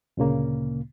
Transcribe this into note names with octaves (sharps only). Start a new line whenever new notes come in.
D2 A#2 C#3 A#3